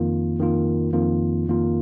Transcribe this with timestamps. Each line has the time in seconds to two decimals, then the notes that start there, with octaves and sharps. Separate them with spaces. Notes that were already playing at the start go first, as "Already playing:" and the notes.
Already playing: F2 D#3 A#3 F4
0.39 F2 D#3 A#3 F4
0.93 F2 D#3 A#3 F4
1.47 F2 D#3 A#3 F4